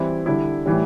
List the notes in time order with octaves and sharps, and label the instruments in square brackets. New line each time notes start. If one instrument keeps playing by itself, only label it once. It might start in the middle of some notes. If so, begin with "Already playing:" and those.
Already playing: [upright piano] E3 G3 C4 E4
D3 G3 E4
A2 E3 G3